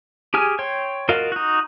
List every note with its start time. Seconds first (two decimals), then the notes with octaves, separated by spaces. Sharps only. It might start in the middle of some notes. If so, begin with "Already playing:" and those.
0.34 G4 G#4 G#5 F6
0.59 C#5 G5 C6
1.09 F4 F#4 A#4 D#5 F5
1.32 D#4 F#4